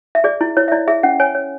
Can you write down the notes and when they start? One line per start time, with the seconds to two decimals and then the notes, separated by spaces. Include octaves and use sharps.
0.15 E5
0.24 G#4 D5
0.41 E4
0.57 E4 C#5
0.68 E5
0.72 E4 D5
0.88 G#4 E5
1.03 C#4 F#5
1.20 C#5 G#5
1.35 C#5